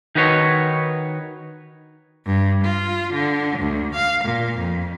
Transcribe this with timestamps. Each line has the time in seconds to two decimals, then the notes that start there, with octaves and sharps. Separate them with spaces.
0.15 D#3 D#4 F#4 B4 C#5
2.25 G2
2.64 F4
3.13 D3
3.59 D2
3.95 F5
4.24 A#2
4.58 F2